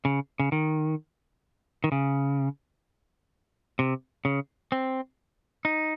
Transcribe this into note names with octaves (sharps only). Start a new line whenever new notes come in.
C#3
C#3
D#3
D#3
C#3
C3
C#3
C4
D#4